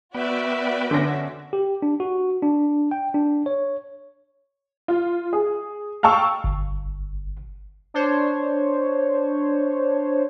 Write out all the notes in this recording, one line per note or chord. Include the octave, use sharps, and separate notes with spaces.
B3 F#4 B4 D5 E5 G5
D3 C#4 A#6
G4
D4
F#4
D4
G5
D4
C#5
F4
G#4
F5 G5 A5 C#6 E6
G1
D4 C5 C#5